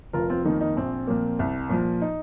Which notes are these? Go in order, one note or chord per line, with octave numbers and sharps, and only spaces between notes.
F1 F4 A#4
C4 F4
F2 D#3 A#3 D#4
D#4
A#1 C4
A#2 F3 A#3
C2
A#2 F3
D#4